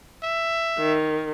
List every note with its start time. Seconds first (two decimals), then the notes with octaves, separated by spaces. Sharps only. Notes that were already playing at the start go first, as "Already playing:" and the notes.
0.24 E5
0.79 D#3